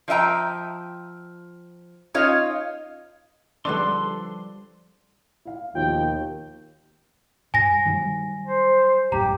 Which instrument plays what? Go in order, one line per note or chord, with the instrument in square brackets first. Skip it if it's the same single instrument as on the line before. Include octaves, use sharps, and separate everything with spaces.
[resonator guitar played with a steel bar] F3 D#5 E5 G5 A#5
C#4 D#4 F4 C#5 D#5 F5
[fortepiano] D3 [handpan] F3 G3 [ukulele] A4 B4 D5 [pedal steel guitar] C6
[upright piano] E4 F5
[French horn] D#2 [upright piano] B2 D#3 F3 [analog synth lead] G5
[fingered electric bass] G2 [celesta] G#5 A#6
[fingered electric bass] D#3 F#3 G3
[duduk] C5
[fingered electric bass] A1 F#2 [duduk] G4 [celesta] A#5